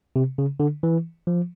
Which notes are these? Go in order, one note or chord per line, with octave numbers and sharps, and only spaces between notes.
C3
C#3
D3
E3
F3